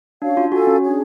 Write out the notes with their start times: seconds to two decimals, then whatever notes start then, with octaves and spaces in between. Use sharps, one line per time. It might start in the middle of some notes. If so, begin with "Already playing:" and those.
0.22 C#4 D4 F#4 C#5 F5
0.37 F4
0.52 F#4 A4 F5 G#5
0.67 C#4
0.82 D4 G#4 C#5